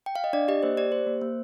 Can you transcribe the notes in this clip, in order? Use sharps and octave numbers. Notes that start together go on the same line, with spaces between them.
G5
F5
D#5
D4 D5
G4 D#5
A#3 C5
G4 D5
G4 C5
A#3
A#3